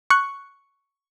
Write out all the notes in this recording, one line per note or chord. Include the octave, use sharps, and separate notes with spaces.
C#6 F#6